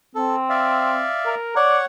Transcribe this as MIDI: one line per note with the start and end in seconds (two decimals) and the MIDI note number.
0.15 1.08 60
0.15 0.36 69
0.50 1.35 74
0.50 1.35 76
0.50 1.35 77
1.26 1.52 70
1.56 1.86 73
1.56 1.78 74
1.56 1.86 78